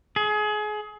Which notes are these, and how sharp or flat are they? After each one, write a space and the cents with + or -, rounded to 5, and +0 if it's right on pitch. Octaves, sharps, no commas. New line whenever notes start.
G#4 +30